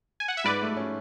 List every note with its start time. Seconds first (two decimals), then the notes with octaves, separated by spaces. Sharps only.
0.20 G#5
0.28 F#5
0.37 E5
0.44 G#2 B4 D5
0.62 A3
0.77 C#4